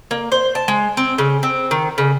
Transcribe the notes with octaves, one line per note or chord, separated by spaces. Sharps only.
A#3
C5
A5
G#3
C4
C#3
C4
D#3
C#3